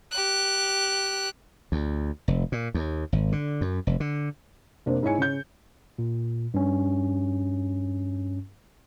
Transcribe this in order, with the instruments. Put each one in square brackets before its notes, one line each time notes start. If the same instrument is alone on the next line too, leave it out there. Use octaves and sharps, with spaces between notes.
[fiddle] G4 F#6
[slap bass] D2
F1
A#2
D#2
G#1
D3
F#2
F1
D3
[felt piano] F1 A#3 D4 C5
G#2 E4 C#5 G#5 C#7
C#3 C#5 G6
[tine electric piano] A#2
G2 C#4